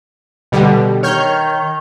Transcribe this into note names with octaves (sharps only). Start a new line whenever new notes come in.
B2 D3 G3
D#3 C#5 F6 G6